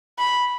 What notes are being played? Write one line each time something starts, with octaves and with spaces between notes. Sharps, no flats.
B5